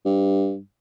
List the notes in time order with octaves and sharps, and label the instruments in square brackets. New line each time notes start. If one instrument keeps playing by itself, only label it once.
[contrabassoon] G2